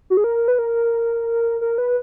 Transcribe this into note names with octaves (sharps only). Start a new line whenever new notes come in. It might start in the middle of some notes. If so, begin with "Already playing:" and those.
F#4
G#4
A#4
B4
A#4
A#4
B4